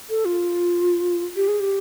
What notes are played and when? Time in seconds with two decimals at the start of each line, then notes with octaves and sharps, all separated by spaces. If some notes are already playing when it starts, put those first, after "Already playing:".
0.10 A4
0.25 F4
1.36 G4
1.48 G#4
1.60 G4